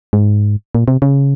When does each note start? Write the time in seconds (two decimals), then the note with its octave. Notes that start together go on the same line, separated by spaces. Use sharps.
0.13 G#2
0.75 A#2
0.88 C3
1.02 C#3